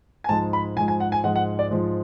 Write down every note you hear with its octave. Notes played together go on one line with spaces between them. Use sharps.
G#5
G#2 F3 G#3 A5
B5
G#2 F3 G#3 G#5
G#5
F#5
G#5
G#2 F3 G#3 F#5
F#5
D5
G#2 F3 G#3